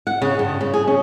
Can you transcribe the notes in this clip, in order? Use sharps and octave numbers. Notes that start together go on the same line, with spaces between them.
F#5
C#3
G2
C#3
G#4
C#4